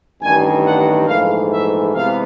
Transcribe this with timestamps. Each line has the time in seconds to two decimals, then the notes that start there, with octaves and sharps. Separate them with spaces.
0.22 A1 G2 D#3 G#5
0.65 F#5
1.08 A#1 G#2 E3 A3 F5
1.51 E5
1.94 C3 E3 G#3 B3 F5